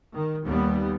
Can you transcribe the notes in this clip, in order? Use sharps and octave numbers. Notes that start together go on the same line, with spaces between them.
D#3
D#2 G3 B3